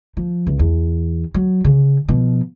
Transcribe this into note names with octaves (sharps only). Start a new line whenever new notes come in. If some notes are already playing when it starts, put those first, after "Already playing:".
F3
C#2
E2
F#3
C#3
B2 F3